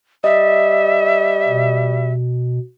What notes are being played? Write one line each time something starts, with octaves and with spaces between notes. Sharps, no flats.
G3 D#5 E5
B2